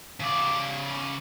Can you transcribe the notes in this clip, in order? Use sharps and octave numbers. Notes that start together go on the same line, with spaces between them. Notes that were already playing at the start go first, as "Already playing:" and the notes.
C#3 D5